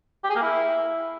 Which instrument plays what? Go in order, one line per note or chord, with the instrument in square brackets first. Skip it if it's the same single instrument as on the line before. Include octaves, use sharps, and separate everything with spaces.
[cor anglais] G4
G#4
A#3
E4